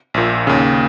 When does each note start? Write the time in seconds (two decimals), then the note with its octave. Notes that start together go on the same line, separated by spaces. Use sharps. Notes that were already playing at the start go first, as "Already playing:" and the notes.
0.14 A#1 A#2
0.47 D#2 C#3